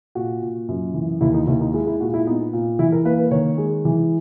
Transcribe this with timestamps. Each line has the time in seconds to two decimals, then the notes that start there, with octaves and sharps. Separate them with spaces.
0.15 A#2 F#4
0.42 A#2
0.68 F#2
0.94 E3
1.21 D#2 E4
1.34 D#4
1.47 D#2 E4
1.61 D#4
1.74 G#3 E4
1.87 E4
2.00 A#2 F#4
2.14 E4
2.27 B3 D#4
2.53 A#2
2.79 E3 E4
2.92 A#4
3.05 A#3 B4
3.18 B4
3.31 D#3 C#5
3.58 G#3
3.85 E3